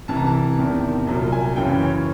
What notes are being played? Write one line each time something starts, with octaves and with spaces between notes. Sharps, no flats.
C2 C3 E3 A5
A#5
A5
E2 C3 D#3
C2 A#2 F#3
G#5
F#2 C#3 E3 G5
C#5